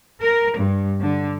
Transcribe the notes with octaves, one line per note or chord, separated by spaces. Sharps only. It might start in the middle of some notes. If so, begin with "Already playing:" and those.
A#4
G2
D3